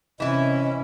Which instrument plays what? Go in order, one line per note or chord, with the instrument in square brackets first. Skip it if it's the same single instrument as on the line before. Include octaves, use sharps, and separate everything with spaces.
[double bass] C3 C#4 [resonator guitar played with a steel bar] E3 E4 [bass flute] D#5